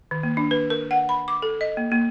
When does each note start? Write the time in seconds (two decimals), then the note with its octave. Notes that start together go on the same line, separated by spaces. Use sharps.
0.11 D#3
0.23 A#3
0.37 D4
0.51 B4
0.70 A#4
0.91 F#5
1.09 B5
1.28 D6
1.42 A4
1.61 D#5
1.77 A#3
1.92 A#3